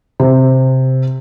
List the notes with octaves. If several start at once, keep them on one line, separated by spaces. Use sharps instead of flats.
C3